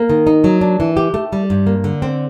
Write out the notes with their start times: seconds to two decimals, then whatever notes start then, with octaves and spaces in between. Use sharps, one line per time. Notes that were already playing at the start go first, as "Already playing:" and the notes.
Already playing: A#3
0.09 D#3
0.27 D#4
0.44 F#3
0.61 D4
0.80 E3
0.97 G4
1.14 A3
1.33 G3
1.50 G2
1.67 A#3
1.84 D3
2.02 C4